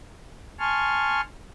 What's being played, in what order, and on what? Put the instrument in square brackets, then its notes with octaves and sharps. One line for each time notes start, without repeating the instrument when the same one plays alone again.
[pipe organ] G#5 A5 C6 C#6 F6